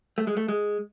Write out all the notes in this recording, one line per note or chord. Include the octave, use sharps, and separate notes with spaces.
A3
G#3
A3
G#3